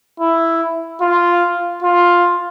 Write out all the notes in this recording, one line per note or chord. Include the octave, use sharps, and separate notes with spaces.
E4
F4
F4